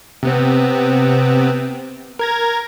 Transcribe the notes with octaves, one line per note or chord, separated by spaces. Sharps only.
C3 B3 C4
A#4 G#6 A#6